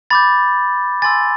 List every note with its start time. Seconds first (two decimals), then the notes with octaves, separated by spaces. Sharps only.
0.10 B5 D6 G6 A6
1.02 G#5 C6 E6 A6